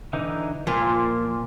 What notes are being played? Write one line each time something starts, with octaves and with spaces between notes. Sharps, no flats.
D3 E3 D#4
A#2 F3 A#3 C6